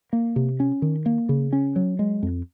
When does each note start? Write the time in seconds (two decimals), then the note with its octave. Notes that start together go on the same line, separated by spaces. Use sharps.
0.13 A#3
0.36 C3
0.60 C#4
0.82 D#3
1.06 A#3
1.29 C#3
1.53 C#4
1.76 F#3
1.99 G#3
2.23 F2